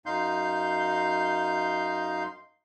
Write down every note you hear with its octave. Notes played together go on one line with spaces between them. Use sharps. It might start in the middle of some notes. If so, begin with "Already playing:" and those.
F#2 D#4 F5 C6 G6